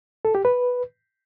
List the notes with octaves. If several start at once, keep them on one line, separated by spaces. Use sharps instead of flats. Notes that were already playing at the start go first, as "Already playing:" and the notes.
A4
G4
B4